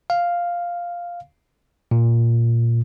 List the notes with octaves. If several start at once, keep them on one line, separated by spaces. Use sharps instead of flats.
F5
A#2